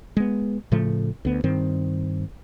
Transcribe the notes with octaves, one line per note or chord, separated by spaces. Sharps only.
G#3 B3
A2 C#3 F3 A3
D2 B3
G2 D#3 C4